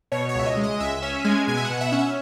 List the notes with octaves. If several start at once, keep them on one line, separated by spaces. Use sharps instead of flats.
B2 C#5
C#5
C#2 E5
D#5
G#3
D#5
C#2 E5
C#4 E5
G#3 G#5
B2 G#5
E5
F#5
B2
E5
C#4 F#5
E5